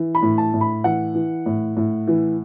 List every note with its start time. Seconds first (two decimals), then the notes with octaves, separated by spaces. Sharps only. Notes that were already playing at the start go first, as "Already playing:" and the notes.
Already playing: E3
0.15 B5
0.22 A2
0.38 A5
0.54 A2
0.61 B5
0.84 E3 F#5
1.14 E3
1.46 A2
1.77 A2
2.07 E3